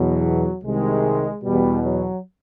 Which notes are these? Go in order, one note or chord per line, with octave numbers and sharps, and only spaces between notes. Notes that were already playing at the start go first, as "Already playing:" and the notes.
Already playing: E2 B2 F#3
C2 C3 D#3 G#3
E2 B2 G3
F#3